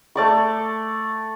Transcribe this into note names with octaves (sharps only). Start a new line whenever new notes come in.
A3 D5 C#6